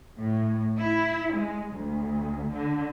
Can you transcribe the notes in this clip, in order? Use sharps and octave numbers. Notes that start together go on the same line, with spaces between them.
A2
E4
G#3
D2
D3